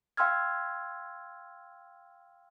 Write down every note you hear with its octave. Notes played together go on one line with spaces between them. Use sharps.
F5 G5 C6 E6 F6 G#6